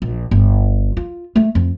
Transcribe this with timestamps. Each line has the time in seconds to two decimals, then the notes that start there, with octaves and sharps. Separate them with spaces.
0.02 A#1
0.31 G1
0.97 F4
1.36 A3
1.55 F2